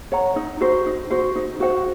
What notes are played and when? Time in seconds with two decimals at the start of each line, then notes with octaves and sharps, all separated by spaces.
0.12 C#5 F#5 A#5
0.36 D#4
0.61 F#4 C5
0.86 D#4
1.10 F#4 C5
1.35 D#4
1.60 F#4 C5 F#5